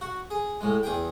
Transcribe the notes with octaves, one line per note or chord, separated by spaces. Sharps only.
F#4
G#4
A2 G#3
E2 G#4 G5